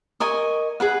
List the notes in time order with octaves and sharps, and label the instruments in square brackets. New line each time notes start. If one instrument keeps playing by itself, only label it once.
[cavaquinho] A#4 D#5 G#5 C#6
G#4 B4 F#5